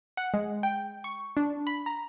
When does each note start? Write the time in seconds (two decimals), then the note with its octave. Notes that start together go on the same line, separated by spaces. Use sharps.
0.17 F#5
0.34 G#3
0.63 G5
1.04 C#6
1.37 D4
1.67 B5
1.86 A#5